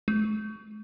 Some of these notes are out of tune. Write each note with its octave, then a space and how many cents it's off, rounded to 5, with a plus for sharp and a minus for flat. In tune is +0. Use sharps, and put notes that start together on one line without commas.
G#3 +45